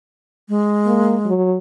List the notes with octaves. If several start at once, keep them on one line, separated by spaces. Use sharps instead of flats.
G#3
A#3
F#3